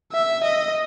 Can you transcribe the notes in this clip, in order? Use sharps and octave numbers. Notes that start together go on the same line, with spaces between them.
E5
D#5